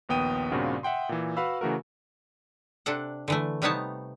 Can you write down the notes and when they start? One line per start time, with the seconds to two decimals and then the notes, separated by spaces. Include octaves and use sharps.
0.09 A#1 D#2 B3 G5 D#6 D#7
0.51 G2 A#2 C#3 C4 F4 F#4
0.83 E5 F#5 G5 C6
1.09 A#2 E3
1.37 F#4 B4 F5 B5 E6
1.61 C#3 E3 A3 F#4 A#4
2.86 C3 D4 A4 F#5
3.28 D3 E3 A3
3.62 C3 G3 B3 D#4 C#5 A5